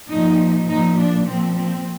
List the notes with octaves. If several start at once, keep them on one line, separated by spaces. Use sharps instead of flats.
A#2 F3 D#4
A#2 F3 D#4
D4
A#2 F3 C4
C4